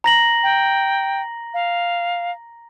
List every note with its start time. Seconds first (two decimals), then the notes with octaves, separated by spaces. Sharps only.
0.04 A#5 A#6 F#7
0.43 G5
1.54 F5